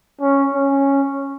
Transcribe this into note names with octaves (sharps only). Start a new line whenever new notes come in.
C#4
C#4